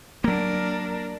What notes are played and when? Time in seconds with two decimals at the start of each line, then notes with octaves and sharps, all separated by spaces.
0.24 F#3 A#3 D4 A#4